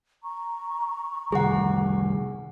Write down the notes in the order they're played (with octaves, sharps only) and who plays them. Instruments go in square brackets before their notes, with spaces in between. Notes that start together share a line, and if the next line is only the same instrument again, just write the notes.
[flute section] A#5 C#6
[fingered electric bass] C3 D#3 G3 [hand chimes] G#4 F#5